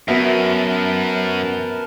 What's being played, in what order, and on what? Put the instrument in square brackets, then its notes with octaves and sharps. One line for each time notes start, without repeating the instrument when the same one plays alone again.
[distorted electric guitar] F#2 [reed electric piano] B3 F#4 E5 [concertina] A#4 B4 A5